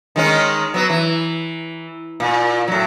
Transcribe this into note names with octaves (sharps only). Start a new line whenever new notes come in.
D#3 G#3 C#4
F#3 B3
E3
A#2
A2 F#3